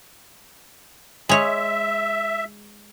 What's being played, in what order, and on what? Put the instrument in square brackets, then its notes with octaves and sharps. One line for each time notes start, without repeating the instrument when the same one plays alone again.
[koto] G#3 C#5 [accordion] E5